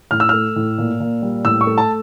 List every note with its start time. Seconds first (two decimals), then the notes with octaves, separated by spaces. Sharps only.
0.11 A2 F6
0.20 E6
0.29 A3 F6
0.56 A2
0.78 A#2
1.00 A#2
1.22 G3
1.45 A2 E6
1.61 C#6
1.67 A3
1.78 A5